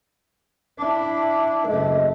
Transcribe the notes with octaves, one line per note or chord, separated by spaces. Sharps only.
D4 E4
F#1 A3 D#5